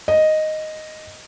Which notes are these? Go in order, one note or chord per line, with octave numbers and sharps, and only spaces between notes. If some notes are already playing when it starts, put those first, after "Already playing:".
D#5